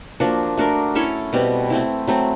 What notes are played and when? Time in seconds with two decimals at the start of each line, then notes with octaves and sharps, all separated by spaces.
0.20 F3 A#3 D4 F#4
0.57 A3 D4 F#4 A#4
0.95 C#4 E4 A4 C#5
1.33 B2 G3 C4
1.70 A3 C4 E4
2.07 F#3 A3 C4